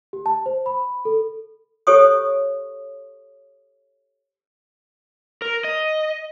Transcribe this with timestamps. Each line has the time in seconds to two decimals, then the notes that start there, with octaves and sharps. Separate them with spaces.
0.13 G4
0.26 A5
0.46 C5
0.66 B5
1.05 A4
1.87 G4 A4 C5 C#5 C#6 D#6
5.42 A#4
5.64 D#5